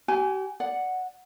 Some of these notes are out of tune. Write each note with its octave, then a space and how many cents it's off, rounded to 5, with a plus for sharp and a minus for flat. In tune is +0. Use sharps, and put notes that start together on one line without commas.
G4 -40 G#5 +0
D5 +0 F#5 +0